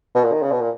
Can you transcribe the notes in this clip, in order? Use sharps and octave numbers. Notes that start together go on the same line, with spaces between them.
B2
A#2
D#3
C#3
B2
A#2